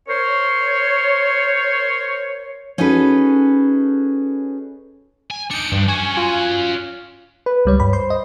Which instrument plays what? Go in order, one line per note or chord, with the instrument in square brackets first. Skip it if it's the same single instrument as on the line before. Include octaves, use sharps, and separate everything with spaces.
[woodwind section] A#4 C5 C#5
[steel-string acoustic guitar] C#4 D#4 F#4 G#4 A4 B4
[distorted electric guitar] G#5
[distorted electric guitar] D4 D#4 [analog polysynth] C#7 D7
[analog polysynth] G2 [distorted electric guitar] F3 D4
[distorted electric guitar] C#4 F#4 [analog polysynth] G#5 [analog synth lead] C#6
[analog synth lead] F4
[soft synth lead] B4
[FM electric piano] C#2 G3 C#5
G2 B5
[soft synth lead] C5 [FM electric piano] C6
[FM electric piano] D#5